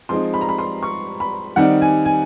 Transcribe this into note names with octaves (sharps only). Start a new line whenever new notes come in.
F3 G#3 C4 D#4 C6
B5
A#5
B5
C6
C#6
B5
D#3 G3 C4 D#4 F#5
G#5
G#5